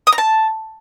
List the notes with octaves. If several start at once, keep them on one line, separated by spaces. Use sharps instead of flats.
D#6
A#5
A5